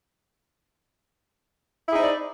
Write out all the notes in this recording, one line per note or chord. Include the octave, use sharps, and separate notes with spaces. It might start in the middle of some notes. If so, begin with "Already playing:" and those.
D#4 E4 G#4 C5 D5